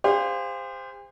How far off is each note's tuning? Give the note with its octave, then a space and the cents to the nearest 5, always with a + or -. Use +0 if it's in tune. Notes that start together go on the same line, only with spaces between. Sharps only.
G4 +45 C5 -10 F5 +10